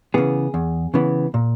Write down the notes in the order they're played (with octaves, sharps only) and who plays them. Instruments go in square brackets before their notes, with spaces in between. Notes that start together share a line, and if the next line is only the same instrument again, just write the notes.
[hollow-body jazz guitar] C#3 E3 B3 G#4
E2
C#3 E3 B3
A#2